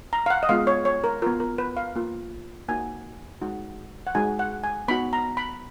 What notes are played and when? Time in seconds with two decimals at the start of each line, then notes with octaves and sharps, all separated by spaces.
0.13 A#5
0.26 F5
0.30 F#5
0.43 D#5
0.49 G#3 B3 F4 F5
0.67 C#5
0.85 C#5
1.04 A#4
1.22 B3 F4 A#4
1.40 A#4
1.58 B4
1.77 F5
1.96 A#3 F4
2.68 A#3 D#4 F#4 G#5
3.41 G#3 D#4 F#4
4.07 F#5
4.15 G#3 D#4 F#4 G#5
4.39 F#5
4.64 G#5
4.88 B3 D#4 F#4 B5
5.13 A#5
5.37 B5